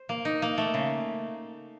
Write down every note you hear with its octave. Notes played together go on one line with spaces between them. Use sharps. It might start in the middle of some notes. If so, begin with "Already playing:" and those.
Already playing: C5
A#3
D#4
A#3
A3
C#3